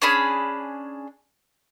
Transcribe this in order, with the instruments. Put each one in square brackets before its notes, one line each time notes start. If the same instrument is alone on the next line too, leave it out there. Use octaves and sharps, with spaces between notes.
[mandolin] C#4 D4 G#4 B5